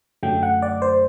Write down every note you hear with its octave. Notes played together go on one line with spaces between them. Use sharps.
F#2 D3 F#3 A3 G5
F#5
D5
C5